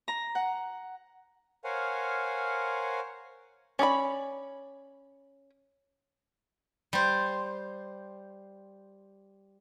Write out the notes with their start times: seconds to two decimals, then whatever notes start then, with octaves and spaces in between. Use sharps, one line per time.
0.08 A#5
0.35 F#5
1.64 A#4 C5 C#5 F5 F#5 G#5
3.79 C#4 D5 D#5 B5
6.93 G3 C5